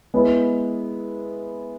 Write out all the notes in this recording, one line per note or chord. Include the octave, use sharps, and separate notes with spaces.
G#3 B3 E4